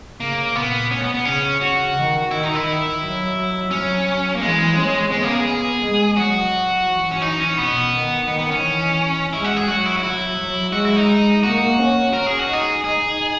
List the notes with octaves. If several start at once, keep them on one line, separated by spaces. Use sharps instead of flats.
C#3 A#3
A#2 B3
B2 C#4
B3
B3
C#3 C#4
F#4
D#3
D#3 E4
D#4
E4
D#3
F#3
F#3 C#4
A#3
E3 G#3
C#4
G#3 B3
A#3
G#4
G#4
G#3
F#3 F#4
E3
C#4
D#4
C#4
B2 B3
D#3
D#3 B3
B3
C#4
E3
G#3 E4
F#4
G#4
F#3 F#4
E4
F#4
E4
F#3
G#3 F#4
E4
D#4
A#3 F#4
C#4
A#4
G#4
F#4
D#4 G#4
D#4 G#4